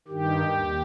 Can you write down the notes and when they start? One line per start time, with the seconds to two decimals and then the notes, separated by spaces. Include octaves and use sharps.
0.08 G2 D#3 G4
0.53 D#2